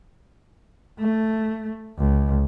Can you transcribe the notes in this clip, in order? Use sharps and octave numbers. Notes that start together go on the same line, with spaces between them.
A3
C#2